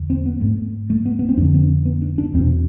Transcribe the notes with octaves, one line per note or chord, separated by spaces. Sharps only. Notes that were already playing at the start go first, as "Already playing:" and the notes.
Already playing: E2 D3
C4
B3
G#2 A3
A3
B3
B3
C4
F2 D3 D4
C4
B3
D4
D4
E2 B2 C4